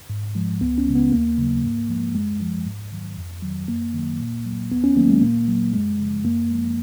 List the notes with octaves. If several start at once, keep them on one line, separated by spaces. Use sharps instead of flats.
G#2
F3 G#3
C#2 B3
C#4
C#3 G#3
B3
D#2 A#3
C#3 F#3
G#2
F3 G#3
F#2 G#3
F3 G#3
G#2
D#3 F#3
F2
D#3 F#3
F#2 A#3
D#3 F#3
A#2
F#3
D#2 B3
C#4
D#3 F#3 A#3
G#3
A#2 A#3
F#3
F#2 G#3
C#3 F3
F#2 A#3
F3 G#3